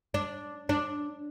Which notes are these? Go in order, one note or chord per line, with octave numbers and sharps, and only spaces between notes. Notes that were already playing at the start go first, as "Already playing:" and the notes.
D4
D4